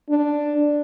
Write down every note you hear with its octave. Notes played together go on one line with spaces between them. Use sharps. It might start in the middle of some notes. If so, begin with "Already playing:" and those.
D4